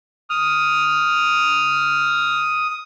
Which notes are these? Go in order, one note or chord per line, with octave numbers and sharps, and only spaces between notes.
D#6 F6